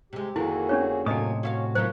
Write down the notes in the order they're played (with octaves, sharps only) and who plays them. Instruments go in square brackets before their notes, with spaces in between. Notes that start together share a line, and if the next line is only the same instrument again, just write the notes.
[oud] C3 G#3 [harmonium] G4
[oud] F2 D3 D#3 [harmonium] A#3 F#4 G#4 [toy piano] E4
[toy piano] C#4 D4 C#5
[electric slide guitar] A2 C3 [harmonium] F#3 A#3 G#5 [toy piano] D#5 D#6
[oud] C#4 E5 F5 [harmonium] F#4
[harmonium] F3 A#3 A#4 [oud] F#3 B3 D#4 [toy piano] C5